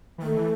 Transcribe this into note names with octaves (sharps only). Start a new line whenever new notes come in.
E3
D#3 A3
E3